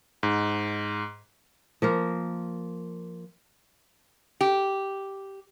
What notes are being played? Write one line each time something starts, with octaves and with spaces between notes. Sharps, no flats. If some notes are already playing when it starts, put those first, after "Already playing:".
G#2
F3 A#3 A#4
G4